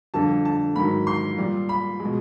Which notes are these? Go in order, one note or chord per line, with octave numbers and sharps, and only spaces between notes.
F2 D3 G3 A5
A5
G#2 D#3 F#3 B5
C6
A#2 G3
B5
B2 G#3